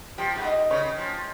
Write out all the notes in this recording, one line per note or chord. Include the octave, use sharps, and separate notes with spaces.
F3 G4 G5
G#2
D#4 D#5
C#3 C#5
F3